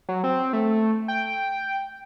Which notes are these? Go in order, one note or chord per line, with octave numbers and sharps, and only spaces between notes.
F#3
C4
A3
G5